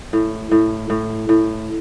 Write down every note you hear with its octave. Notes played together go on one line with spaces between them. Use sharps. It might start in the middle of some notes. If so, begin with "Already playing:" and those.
A2
A2
A2
A2